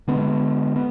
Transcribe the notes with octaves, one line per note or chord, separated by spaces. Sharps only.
D3 G#3 B3
B3